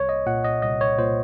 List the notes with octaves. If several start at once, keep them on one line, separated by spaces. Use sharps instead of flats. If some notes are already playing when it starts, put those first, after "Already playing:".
Already playing: C2 C#5
D#5
A#2 F#5
D#5
C2 D#5
C#5
A#2 C5